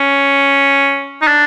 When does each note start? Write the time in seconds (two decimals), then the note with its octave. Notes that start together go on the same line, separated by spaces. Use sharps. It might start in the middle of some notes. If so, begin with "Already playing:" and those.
Already playing: C#4
1.22 D#4
1.27 D4